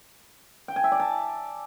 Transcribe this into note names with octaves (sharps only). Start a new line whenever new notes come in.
G5
G#5
E5
D5
A5